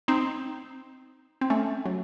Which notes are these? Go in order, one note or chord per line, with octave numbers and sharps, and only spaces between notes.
C4 D#4
C4
A3 C#4
F#3